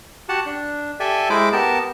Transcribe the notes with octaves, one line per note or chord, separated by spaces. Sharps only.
F#4 G4 F#5 A5
D4
G4 A4 D5 E5 G#5
G#3 E4 C5 B5 D6
B3 G4 A#4 A5